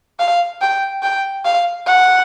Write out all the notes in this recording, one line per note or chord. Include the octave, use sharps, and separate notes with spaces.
F5
G5
G5
F5
F#5